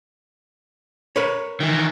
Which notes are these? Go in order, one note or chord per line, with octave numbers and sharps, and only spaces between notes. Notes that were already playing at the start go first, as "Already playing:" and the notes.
A#4 B4 C#5
D#3 E3